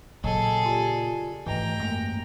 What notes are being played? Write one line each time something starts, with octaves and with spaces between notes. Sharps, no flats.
A#2 C#3 F#3 G#4 A4 D#5 G#5
F4 G4 D5
G#2 E3 A3 B3 D#5 G5 A#5
F#2 G#3 A#3